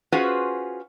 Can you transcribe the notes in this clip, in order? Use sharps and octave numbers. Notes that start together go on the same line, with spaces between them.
C#4 F4 F#4 G#4 B4 C5